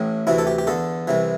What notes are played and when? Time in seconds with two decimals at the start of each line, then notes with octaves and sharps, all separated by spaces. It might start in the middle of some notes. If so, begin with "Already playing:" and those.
Already playing: A1 A2
0.27 D2 C3 E3 E4
0.38 A4
0.47 G4
0.59 G4
0.67 E2 D3 A4
1.08 C2 C3 E3